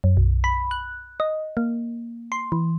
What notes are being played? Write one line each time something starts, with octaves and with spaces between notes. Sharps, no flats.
F#2
B1
B5
F#6
D#5
A#3
C6
E3